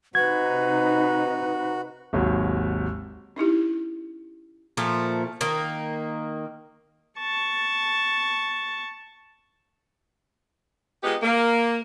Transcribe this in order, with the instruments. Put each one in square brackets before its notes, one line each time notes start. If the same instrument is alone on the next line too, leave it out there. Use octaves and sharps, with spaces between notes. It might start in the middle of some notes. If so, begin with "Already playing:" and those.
[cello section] C3 D#4 [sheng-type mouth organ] F#4 [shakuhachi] B4 [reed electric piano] G#6
[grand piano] G#1 D#2 F#3
[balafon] C#4 D#4 E4 G4
[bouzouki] A#2 F3 A3
D#3 A#3
[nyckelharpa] A5 C#6
[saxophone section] G#3 B3 D#4 F4 G4
A#3